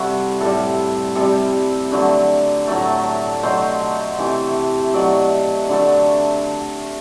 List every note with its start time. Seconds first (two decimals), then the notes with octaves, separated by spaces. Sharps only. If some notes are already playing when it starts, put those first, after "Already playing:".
Already playing: C3 G3 A3 E4 F#4
0.40 A2 G3 A4
1.15 C3 G3 A4
1.92 D3 F#3 A3
2.67 A2 F#3 A3
3.43 B2 F#3 A3 C5
4.18 C3 E3 A3
4.93 B2 F#3 A3 D5
5.69 D3 F#3 A3